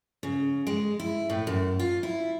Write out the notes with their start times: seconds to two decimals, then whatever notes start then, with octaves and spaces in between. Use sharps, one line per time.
0.23 C#3
0.67 G#3
1.00 E4
1.30 A2
1.47 F#2
1.80 F4
2.03 E4